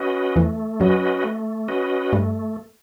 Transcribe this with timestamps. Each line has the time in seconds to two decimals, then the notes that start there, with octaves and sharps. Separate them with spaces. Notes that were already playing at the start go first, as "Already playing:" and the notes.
Already playing: C#4 F#4 B4 D#5
0.36 E2 E3 A3
0.80 F#2 F#3 C#4 F#4 B4 D#5
1.24 A3
1.68 C#4 F#4 B4 D#5
2.12 G2 G3 A3